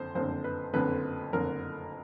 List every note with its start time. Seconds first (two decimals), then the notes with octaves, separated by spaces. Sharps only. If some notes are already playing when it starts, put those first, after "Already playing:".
Already playing: F#1 F2 D3 C5
0.15 F#1 F2 D3 C5
0.44 B4
0.73 F#1 F2 D3 B4
1.33 F#1 F2 D3 A#4